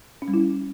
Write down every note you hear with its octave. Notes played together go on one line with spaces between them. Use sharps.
C#4
G3
E4